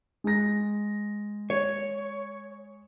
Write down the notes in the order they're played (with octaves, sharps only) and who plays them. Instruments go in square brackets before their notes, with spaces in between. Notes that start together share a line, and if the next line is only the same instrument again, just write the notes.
[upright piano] G#3 A#6
[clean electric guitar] C#5